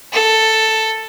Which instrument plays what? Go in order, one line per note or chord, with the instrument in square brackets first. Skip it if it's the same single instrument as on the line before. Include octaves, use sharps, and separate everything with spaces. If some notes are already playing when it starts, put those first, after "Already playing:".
[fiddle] A4